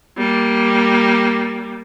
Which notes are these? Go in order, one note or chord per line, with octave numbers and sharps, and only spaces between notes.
G3 A#3